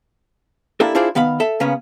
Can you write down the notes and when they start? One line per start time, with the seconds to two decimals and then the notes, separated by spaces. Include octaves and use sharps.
0.80 A#3 D4 E4 G4 A4
0.95 D4 E4 F4 G#4 C5 D5
1.15 D#3 B3 F5 B5
1.40 A4 E5
1.60 C#3 A#3 B3 C#4